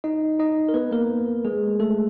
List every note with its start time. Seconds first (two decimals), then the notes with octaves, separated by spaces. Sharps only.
0.04 D#4 D#5
0.39 D#4 D#5
0.69 A#4
0.74 B3 B4
0.91 A#3 A#4
1.45 G#3 G#4
1.80 A3 A4